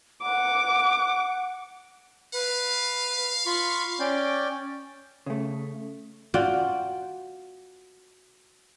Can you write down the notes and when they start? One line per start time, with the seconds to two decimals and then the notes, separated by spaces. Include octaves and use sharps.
0.22 F#5 D6
2.34 B4 F5
3.46 F4 B5 C#6
4.00 C#4 D5 G5
5.26 C#3 A3
6.34 F4 F#4 D5 G5